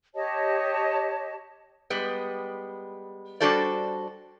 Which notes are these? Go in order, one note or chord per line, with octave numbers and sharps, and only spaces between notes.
G4 C#5 D#5 A5
G3 G#3 B3
G3 D4 F#4 A4 C5 D5